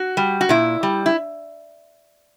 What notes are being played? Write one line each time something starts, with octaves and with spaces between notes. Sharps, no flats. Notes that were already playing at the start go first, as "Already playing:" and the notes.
Already playing: F#4
G3
F#4
A#2 E4
G3
E4